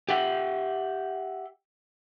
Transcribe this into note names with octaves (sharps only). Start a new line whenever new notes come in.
G4 E5 F#5 G5